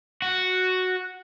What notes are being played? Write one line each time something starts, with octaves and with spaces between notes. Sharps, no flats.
F#4